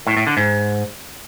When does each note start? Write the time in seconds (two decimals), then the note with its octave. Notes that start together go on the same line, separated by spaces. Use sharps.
0.07 A2
0.17 A2
0.27 D3
0.37 G#2